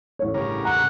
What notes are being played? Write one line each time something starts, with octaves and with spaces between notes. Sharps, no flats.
A1 C#5
G2 C#3 A#4
F#5 A#5